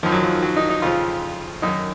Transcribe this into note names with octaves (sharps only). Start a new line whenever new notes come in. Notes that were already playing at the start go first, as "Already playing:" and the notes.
F#2 D#3 F3
F#3
F3
F#3
D#4
D#4
F2 C#3 F3 F4
F#2 D#3 D#4